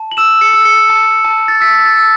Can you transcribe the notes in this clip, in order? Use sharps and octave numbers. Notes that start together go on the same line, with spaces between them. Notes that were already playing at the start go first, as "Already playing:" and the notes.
Already playing: A5
F#7
E6 E7
C#7
E6
C#7
A5
A5
A6
E6 B6
A6
E6